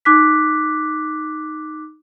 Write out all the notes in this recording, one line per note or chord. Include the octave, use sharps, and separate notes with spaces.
D#4 D6 F#6 B6